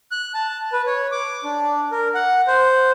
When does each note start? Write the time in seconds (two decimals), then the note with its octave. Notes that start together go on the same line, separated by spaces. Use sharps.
0.12 F#6
0.34 A5
0.72 B4
0.87 C#5
1.12 D6
1.44 D4
1.91 A#4
2.15 F#5
2.47 C5